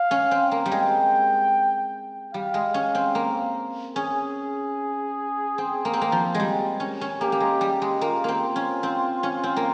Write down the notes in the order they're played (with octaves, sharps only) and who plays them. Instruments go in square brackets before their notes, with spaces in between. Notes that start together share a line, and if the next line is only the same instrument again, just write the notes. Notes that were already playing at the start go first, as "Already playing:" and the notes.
Already playing: [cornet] F5
[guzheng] C#4
C4
A#3
G3
[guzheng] G#3 [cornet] G5
[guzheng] G3 [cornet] F5
[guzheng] G#3
C#4
C4
A#3
[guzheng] C#4 [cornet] G#4
[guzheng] C4
A#3
C4
A#3
F3
G#3
G3
C#4
C#4
[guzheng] A#3 [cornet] G4
[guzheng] A#3
G#3
G3
G#3
[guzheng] A#3 [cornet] F4
[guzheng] A#3 C4
C#4
C4
C#4
C4
A#3